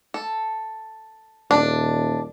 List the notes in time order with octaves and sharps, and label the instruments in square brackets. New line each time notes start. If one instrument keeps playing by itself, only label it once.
[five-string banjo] A4
[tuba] D#1 [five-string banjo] D4